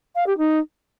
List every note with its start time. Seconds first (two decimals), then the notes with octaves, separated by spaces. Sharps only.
0.15 F5
0.27 G4
0.38 D#4